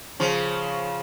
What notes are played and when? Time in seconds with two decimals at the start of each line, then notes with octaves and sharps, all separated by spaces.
0.20 C#3 F3